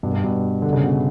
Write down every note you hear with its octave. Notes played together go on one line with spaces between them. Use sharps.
G2 B2
G2
G2 B2
D3
C#3
B2